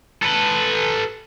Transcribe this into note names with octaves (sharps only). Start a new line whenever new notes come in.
A4 B4